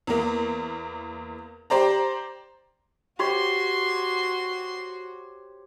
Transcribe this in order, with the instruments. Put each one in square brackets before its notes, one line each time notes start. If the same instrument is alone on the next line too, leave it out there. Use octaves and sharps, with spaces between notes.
[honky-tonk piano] E2 A#3
G4 C5 D5 A#5
[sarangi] F#4 [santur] G4 C5 C#5 [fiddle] C6